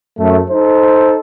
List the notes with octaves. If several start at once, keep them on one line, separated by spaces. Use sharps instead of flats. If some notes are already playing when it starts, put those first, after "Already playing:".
F#2 A3
D#4 A4 C5